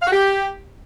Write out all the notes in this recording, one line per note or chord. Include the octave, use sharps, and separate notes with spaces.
F5
F#4
G4